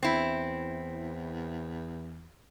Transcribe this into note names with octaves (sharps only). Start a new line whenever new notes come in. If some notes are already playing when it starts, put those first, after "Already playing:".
E2 C4 E4